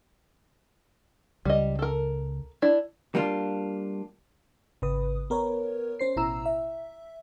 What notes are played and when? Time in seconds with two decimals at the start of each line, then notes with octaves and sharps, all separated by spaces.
1.45 C#2 G3 D#5
1.79 A4 A#4
2.62 D4 E4 D5
3.15 G3 A#3 D4 F4
4.82 G#1 C#3 B4 D#6
5.30 B3 A#4 B4 C#5
5.99 C#4 C5 C7
6.16 A1 B2 E4 A#5 E6
6.46 E5